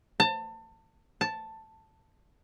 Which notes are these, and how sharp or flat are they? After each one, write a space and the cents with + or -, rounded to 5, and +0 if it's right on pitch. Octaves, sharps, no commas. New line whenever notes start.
A5 +30
A5 +5